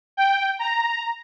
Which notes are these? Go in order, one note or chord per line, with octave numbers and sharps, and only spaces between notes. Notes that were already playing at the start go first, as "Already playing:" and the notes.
G5
A#5